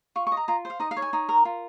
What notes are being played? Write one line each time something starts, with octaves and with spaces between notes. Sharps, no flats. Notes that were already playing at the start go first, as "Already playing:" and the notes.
F4 C#6
C#6
D#5
A#5
F4 A#5
C5
F5
D#4 D#5
F5
C#5
G#5
D#4
A#4
F4